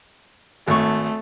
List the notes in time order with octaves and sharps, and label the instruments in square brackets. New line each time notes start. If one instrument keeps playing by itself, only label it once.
[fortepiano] G#1 C#6 [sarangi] A3